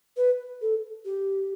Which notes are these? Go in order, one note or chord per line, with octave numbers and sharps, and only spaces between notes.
B4
A4
G4